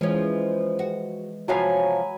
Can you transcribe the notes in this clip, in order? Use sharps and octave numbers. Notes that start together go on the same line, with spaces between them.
E3 F3 G#3 C#4
F#4
C3 F3 F#3 F5 G#5 B5